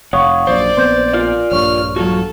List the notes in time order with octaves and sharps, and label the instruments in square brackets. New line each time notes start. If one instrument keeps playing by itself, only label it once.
[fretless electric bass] F1 [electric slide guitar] C#5 F#5 [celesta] F5 C#6 D#6
[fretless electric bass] A#1 F#2 [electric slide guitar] C5 [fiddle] D5
[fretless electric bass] A#1 B3 C4 [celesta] C6 G6
[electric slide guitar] F4 A#4 D5
[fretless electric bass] A#1 G2 [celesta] C#5 C#6 [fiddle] F6
[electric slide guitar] F#3 F4 F#4 [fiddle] A4